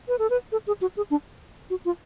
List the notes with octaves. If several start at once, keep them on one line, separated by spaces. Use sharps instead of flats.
B4
A4
B4
A4
G#4
F#4
G#4
D4
F#4
F4